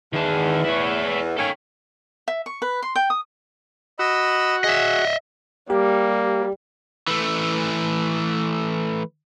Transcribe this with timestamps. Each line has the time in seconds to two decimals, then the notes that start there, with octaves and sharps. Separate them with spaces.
0.13 E2 D#3 A5
0.64 E4 C#5
1.37 D#3 A#3 C#4 A4 G5
2.28 E5
2.46 C#6
2.62 B4
2.82 C6
2.96 G5
3.10 D#6
3.99 F#4 D#5 B5 E6
4.64 G#4 D#5 E5
5.70 G3 A#3 G4
7.08 E3 A3